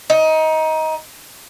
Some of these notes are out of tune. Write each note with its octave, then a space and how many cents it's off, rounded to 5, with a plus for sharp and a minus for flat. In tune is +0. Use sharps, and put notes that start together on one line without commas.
D#4 +20